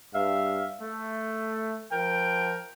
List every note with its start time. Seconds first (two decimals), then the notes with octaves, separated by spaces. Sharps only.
0.13 G2 E5 F5
0.80 A3
1.91 F3 A#4 G5